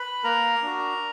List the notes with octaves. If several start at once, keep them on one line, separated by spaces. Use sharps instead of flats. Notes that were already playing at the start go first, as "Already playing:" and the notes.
Already playing: B4 B5
A#3 A#4 A#5
D4 F#4